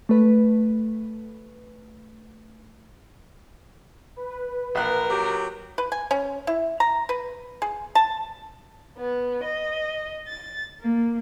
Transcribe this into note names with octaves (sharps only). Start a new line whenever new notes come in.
A3 B4
B4
A#1 A#4 F#6
F#3 G4
B4
G#5
C#4
E4
A#5
B4
G#4
A5
B3
D#5
A6
A#3